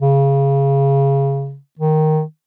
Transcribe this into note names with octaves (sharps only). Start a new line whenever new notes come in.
C#3
D#3